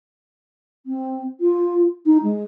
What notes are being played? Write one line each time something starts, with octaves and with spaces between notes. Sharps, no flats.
C4
F4
D#4
G#3